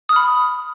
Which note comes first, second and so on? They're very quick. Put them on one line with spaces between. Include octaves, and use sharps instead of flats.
D#6 F6 B5